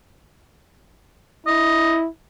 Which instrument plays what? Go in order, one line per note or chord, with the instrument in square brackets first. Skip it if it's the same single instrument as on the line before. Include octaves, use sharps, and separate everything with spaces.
[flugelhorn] E4 [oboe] D#5